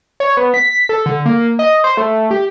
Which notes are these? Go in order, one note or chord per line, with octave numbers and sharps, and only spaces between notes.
C#5
B3
B6
A4
D3
A#3
D#5
C5
A3
G4